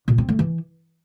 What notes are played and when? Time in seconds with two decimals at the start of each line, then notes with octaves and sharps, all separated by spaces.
0.08 A#2
0.18 C4
0.29 A3
0.39 E3